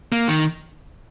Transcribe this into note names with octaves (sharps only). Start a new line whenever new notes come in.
A#3
D#3